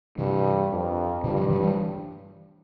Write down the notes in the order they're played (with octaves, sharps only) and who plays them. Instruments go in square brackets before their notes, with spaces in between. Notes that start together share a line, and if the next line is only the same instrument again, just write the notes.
[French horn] G2 [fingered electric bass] C3 E3
[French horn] F2
[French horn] G2 [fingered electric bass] A#2 D3
[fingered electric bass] D3 F3
E3 G3
E3 G3